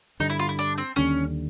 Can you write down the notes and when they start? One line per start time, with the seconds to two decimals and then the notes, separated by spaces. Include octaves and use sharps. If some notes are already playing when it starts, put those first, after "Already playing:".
0.20 G2 D3 G3 D#4
0.30 E4
0.39 F4
0.49 E4
0.59 D4
0.78 C4
0.96 D#2 D3 G3 C#4